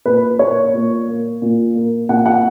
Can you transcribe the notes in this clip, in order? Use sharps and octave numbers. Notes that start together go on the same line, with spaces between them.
A#2 B4
A#3 C#5
A#2
A#3
A#2
A#3
A#2 F#5
F#5